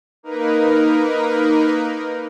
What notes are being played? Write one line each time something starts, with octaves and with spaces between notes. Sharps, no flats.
A#3 D#4 A#4 B4